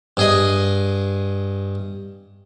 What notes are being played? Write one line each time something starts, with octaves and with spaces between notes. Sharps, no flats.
G2 G#4 D#5